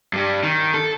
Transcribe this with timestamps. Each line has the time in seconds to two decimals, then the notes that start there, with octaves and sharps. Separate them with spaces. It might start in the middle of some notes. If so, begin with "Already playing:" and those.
0.13 G2 G3
0.43 D#3
0.74 A4